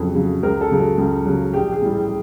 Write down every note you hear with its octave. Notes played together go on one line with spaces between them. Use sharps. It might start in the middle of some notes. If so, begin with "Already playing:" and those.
Already playing: F2 C#3 F#3 A4
C#3 F#3
C#2 A#4
A4
C#3 F#3
A4
C#2
C#3 F#3
A#1 G4
G#4
A2 E3 G3